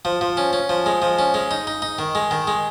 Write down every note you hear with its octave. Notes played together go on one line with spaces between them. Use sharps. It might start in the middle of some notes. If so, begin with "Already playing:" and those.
F3
F3
C#4
C#4
F3
G#3
F3
C#4
G#3
D#4
D#4
D#4
D#3
G#3
D#3
G#3